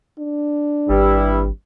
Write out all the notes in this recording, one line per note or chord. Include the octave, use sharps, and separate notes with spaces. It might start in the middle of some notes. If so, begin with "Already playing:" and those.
D4
G#1 G2 G3 E4